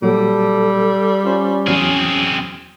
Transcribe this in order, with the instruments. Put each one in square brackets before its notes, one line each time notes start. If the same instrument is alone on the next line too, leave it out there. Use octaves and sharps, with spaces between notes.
[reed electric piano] A#2 F#3 [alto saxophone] G3 [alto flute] A4
[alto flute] C#4 [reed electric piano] F4 C5
[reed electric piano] E2 F#3 F6 [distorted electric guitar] C4 G#4